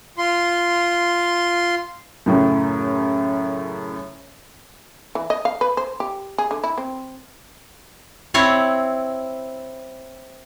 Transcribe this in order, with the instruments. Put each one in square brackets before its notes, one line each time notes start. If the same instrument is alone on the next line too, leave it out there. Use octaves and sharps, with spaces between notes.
[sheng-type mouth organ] F4 C6
[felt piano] F#2 A2 C#3
[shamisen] E3
D#5
F5
B4
C5
G4
G#4
D3
E4
C4
[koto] C4 E4 C#5